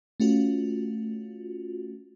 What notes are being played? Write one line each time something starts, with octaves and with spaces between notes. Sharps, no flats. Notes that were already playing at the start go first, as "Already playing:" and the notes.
A3 C#4 F4 F#4